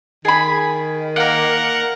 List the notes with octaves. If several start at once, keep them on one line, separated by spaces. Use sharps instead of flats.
D#3 G#4 B5
A#3 A#4 F#5